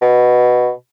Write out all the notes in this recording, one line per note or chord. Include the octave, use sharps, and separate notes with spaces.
B2